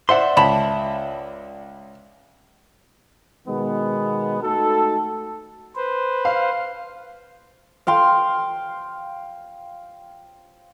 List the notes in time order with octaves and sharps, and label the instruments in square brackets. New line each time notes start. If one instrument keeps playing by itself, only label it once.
[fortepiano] C5 F#5 [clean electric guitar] D5 E5 C6
[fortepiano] C#2 [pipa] A5 B5
[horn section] B2 D#3 G#3 B3
A3 D#4 F#4 A4
[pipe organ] B4 C5
[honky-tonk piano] F5
[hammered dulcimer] F5 G5 C6